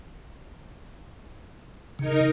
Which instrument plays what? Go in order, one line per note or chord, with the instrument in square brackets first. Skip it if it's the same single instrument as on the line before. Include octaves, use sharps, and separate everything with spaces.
[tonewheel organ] C#3 [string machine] D#4 A#4